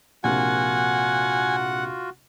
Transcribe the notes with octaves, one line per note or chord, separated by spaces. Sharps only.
A#1 C3 A#3 F4 F#4 F#5 G#5